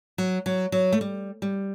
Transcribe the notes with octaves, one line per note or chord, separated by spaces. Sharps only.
F#3
F#3
F#3
A3
G3
G3